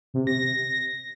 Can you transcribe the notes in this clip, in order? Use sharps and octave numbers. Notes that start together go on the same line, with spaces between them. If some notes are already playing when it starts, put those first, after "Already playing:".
C3
A#6